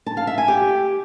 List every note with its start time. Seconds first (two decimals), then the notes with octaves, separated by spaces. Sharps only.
0.06 A5
0.17 F5
0.27 E5
0.38 G#5
0.48 G4